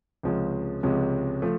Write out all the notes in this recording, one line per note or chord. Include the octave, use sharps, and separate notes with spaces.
C#2 C3 F3 G#3 C#4
C#2 C3 F3 G#3 C#4
F3 A3